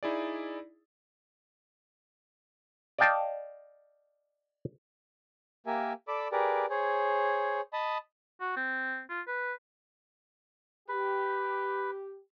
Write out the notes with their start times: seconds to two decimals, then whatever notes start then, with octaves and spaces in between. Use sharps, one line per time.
0.03 D#4 E4 G#4 D5
2.99 D5 D#5 F5 G5 A5
5.66 A#3 G4 A#4 E5 G#5
6.08 A4 D5 B5 D6 E6
6.32 G4 G#4 A#4 B4 D5
6.70 G#4 C5 C#5
7.73 D#5 A5 B5 D#6
8.41 F#4
8.57 C4
9.10 F4
9.27 B4
10.88 G4 B4